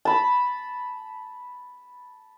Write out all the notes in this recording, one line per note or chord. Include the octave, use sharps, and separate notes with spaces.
A5 B5